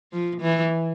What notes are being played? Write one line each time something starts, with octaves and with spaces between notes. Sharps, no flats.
F3
E3